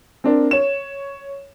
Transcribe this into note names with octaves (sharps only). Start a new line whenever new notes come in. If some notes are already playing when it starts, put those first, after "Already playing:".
C4 D4 A#4
C#5 E7